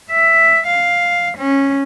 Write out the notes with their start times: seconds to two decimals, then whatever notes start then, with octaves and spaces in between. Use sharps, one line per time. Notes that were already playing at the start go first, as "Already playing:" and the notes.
0.11 E5
0.67 F5
1.38 C#4